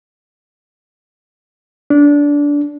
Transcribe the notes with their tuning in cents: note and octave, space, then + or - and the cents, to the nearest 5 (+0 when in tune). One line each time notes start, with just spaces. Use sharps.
D4 -20